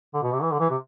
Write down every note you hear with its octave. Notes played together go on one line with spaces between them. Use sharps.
D3
B2
C3
E3
D3
E3
C3